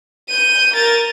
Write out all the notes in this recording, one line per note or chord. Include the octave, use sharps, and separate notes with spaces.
G6 D#7
A#4 A6